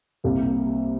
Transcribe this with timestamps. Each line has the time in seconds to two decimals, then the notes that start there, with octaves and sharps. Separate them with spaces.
0.24 C2 C3 A#3